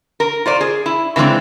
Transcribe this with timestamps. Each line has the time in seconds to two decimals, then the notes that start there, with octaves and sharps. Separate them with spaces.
0.20 A#4
0.46 F4 C5 D5
0.61 G#4
0.86 E4
1.16 C#3 E3 G#3 C4 D4